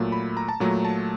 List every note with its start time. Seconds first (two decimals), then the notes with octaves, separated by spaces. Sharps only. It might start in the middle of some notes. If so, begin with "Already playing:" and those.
Already playing: A#2 F#3 A3
0.12 B5
0.37 A#5
0.49 A5
0.60 A#2 F#3 A3 A#5
0.85 A5